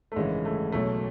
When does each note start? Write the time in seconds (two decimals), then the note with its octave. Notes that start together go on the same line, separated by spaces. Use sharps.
0.12 A3
0.16 G#1 F#2 C#3 E3 G#3
0.45 A3
0.72 B1 B2 F#3 A3